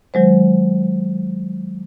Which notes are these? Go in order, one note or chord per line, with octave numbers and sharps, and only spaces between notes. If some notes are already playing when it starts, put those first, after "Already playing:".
D#3 F#3 G#3 C5